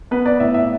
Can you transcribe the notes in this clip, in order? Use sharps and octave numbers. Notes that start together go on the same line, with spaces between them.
B3 B4
D5
A2 E5
E5